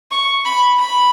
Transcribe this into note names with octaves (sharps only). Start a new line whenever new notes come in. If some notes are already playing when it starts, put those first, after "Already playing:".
C#6
B5
B5